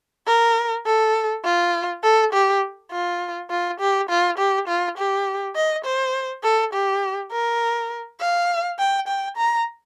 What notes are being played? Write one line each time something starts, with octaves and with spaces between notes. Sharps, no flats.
A#4
A4
F4
A4
G4
F4
F4
G4
F4
G4
F4
G4
D#5
C5
A4
G4
A#4
F5
G5
G5
A#5